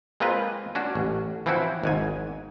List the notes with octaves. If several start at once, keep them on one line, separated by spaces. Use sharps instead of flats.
G#3 A#3 C4 F4 B4 D#5
C#4 D4 F#4
A1
E3 F3 C4 C#4 E4 F#4
G#1 G#2 G#5